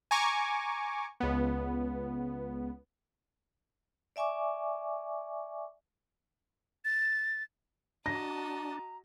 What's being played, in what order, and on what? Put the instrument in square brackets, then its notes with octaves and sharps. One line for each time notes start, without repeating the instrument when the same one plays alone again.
[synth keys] G#5 A#5 C#6 D6
C#2 B3
[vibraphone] D5 E5 G#5 C#6 D6
[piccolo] A6
[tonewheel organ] D4 [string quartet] F#4 D#5 A5 [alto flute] A#5 [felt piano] A#6